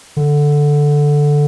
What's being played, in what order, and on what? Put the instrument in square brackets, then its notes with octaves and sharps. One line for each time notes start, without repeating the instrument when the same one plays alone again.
[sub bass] D3